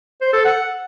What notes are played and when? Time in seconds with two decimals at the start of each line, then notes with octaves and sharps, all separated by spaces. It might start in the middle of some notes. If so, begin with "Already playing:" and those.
0.21 C5
0.33 A4
0.45 F#5